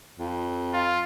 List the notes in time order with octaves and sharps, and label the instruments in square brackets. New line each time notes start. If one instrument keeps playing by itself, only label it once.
[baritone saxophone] F2
[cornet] F4